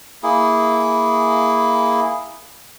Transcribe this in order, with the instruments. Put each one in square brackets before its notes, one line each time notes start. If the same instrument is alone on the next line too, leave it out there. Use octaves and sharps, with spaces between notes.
[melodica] A#3 E4 G#4